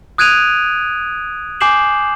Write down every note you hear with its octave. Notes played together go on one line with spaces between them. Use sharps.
D#6 F#6 G#6 D7 D#7 F7
G#5 D6 G6 C7 E7 F#7